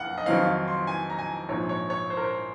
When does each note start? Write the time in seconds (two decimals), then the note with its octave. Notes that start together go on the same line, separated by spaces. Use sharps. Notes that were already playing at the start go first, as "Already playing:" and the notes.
Already playing: F#1 F2 F5 F#5
0.18 D#5
0.26 F2 D#3 F#3 C4 D#4 F5
0.47 F5
0.68 C6
0.87 G#5
1.10 A#5
1.19 G#5
1.49 A#1 G#2 F3 C#5
1.69 C#5
1.90 C#5
2.10 C5
2.17 A#4
2.24 C5